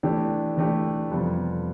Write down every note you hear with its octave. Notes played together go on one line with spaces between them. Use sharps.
E3 A3 D4 G4
E3 A3 D4 G4
F2 C3 G3 B3